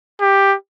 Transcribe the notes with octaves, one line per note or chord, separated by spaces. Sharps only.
G4